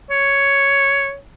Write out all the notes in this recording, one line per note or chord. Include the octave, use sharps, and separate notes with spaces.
C#5